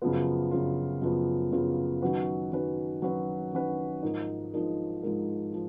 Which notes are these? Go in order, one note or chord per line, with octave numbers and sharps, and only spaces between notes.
F#2 C#3 F3 B3 F4
F#2 C#3 F3 B3 F4
F#2 C#3 F3 B3 F4
F#2 C#3 F3 B3 F4
D#3 F#3 C#4 F#4 B4
D#3 F#3 C#4 F#4 B4
D#3 F#3 C#4 F#4 B4
D#3 F#3 C#4 F#4 B4
G#2 F3 G#3 D#4 A#4
G#2 F3 G#3 D#4 A#4
G#2 F3 G#3 D#4 A#4
F3